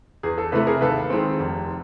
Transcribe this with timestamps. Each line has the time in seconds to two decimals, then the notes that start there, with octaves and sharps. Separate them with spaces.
0.23 E2 G#4
0.38 A4
0.52 C3 E3 A3 A4 B4
0.67 G#4 A#4
0.81 D#2 A4 B4
1.10 D#3 G#3 C4
1.39 F1